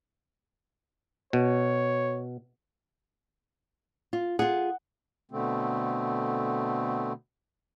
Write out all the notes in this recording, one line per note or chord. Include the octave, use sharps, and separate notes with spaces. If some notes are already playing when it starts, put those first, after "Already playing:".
B2 C#5
F4
F4 G#4 F#5
B2 D3 A3 C4